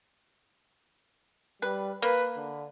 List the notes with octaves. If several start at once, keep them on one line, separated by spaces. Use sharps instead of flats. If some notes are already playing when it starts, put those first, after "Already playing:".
G3 B4
A#3 B4
D3